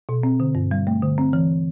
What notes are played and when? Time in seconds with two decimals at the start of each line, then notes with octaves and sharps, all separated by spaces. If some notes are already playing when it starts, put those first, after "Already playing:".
0.09 B2
0.23 C4
0.40 D3
0.55 G2
0.71 G3
0.87 A3
1.03 D3
1.18 C4
1.33 E3